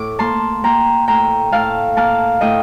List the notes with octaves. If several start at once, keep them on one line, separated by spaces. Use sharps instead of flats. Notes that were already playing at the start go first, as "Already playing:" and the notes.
Already playing: A2 D6
A#3 A5 C6
A#3 G5 A#5
A2 G5 A#5
A2 F5 A5
A#3 F5 A5
A2 D#5 G5